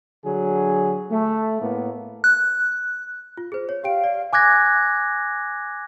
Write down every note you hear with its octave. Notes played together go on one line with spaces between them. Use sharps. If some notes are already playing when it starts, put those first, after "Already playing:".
D3 F#3 G#4
A3
A2 A#3 B3
F#6
F4
G#4 C5
C#5
G4 F5 G5 D7
D5
G#5 D6 F#6 G#6 A#6